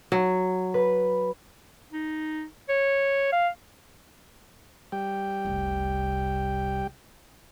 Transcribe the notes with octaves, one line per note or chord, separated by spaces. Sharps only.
F#3
B4
D#4
C#5
F5
G3 G5
F1 C2